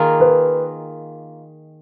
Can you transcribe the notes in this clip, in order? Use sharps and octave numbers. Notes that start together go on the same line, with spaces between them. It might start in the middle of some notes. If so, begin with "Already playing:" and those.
Already playing: D#3 A#3 F4 G#4
B4